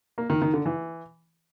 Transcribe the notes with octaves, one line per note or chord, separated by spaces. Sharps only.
A#3
D#3
D#3
D3
E3